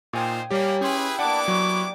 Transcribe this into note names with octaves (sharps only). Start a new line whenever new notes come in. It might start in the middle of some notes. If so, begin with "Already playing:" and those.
A#2 D#4 F4 C5 G5 G#5 D#6
G3 A#3 G4 C#5
C#4 E4 G4 G#4 B4 C6
A#3 B3 D4 E4 F#5 A5 D6
F#3 C#6